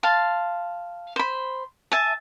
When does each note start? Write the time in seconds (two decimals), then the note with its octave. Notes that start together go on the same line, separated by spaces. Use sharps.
0.03 F5 A5 C6
1.16 C5 B5
1.92 E5 G#5 A5